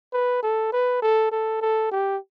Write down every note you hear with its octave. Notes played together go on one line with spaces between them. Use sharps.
B4
A4
B4
A4
A4
A4
G4